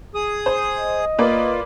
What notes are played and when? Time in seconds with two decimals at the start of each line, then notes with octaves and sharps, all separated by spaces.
0.14 G#4 D#6
0.46 C5
0.77 D#5
1.18 A#3 F4 B4 D5